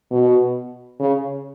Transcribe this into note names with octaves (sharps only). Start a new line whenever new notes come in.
B2
C#3